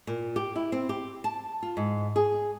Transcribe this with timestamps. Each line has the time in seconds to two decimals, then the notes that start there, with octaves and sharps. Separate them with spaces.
0.07 A#2
0.36 G4
0.56 E4
0.72 C4
0.89 G4
1.24 A5
1.63 F4
1.77 G#2
2.16 G#4